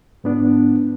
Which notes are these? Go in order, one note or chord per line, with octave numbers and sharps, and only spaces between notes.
G#2 B3 D4